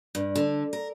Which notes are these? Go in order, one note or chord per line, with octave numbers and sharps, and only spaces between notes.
G2
D3
A#4